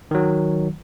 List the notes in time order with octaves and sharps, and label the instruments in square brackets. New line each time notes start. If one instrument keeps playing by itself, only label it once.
[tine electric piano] D#3 F#3